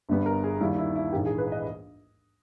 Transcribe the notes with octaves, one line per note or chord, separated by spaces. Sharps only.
G1 G2 G3 B3
A#4
G#4
D#2 D#3 G3 E4
E4
E4
A#1 G#2 E3 A#3 G4
G#4
B4
D#5